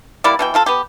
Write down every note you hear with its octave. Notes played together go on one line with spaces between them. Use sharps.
G3 A#3 E4 D5
B2 E3 G5
F3 F4 A4
B3 G4